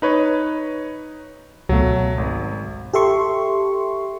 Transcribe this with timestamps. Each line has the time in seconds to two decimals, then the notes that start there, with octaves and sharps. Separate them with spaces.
0.02 D#4 B4 C#5
1.69 C#2 B2 F#3 A3
2.18 G#1
2.94 G4 A4 E5 C6 C#6